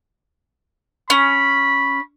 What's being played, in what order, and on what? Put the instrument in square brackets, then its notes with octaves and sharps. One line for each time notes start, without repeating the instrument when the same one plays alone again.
[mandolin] C#4 [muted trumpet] B5